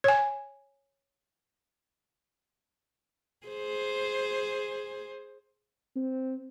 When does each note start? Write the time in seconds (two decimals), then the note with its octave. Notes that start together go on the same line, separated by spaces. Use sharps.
0.04 C#5 G#5
3.47 G#4 C5
5.96 C4